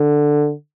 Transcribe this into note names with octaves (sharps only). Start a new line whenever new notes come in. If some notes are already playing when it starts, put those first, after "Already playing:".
Already playing: D3